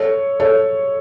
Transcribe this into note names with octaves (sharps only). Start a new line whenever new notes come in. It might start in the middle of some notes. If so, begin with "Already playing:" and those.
Already playing: A4 C#5
A4 C#5